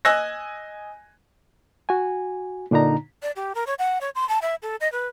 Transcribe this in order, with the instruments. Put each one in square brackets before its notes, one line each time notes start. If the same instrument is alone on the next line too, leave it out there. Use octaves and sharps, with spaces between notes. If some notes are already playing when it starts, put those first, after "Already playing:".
[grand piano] D#5 G#5 E6 F#6 G#6 A#6
[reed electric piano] F#4 G#5
A#2 D3 D4 D#4 A#5
[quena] D5
G4
A#4
C#5
F#5
C#5
C6
A5
E5
A4
D#5
B4